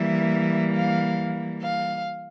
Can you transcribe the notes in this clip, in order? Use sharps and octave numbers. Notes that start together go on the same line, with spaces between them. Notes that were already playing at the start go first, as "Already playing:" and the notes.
Already playing: E3 G3 A#3 E5
F5
F5